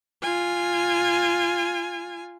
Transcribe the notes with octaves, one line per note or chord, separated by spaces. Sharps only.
F4 G#5